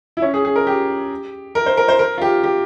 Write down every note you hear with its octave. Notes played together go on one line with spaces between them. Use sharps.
E4
C#4
G#4
G#4
A#4
G4
A#4
C5
A#4
C5
A#4
F4
G4
G4